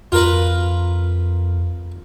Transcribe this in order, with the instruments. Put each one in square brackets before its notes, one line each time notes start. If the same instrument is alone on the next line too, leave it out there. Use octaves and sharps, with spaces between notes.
[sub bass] F2 [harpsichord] F4 A#4 B4